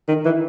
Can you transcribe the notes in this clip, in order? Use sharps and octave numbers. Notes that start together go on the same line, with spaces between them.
D#3
E3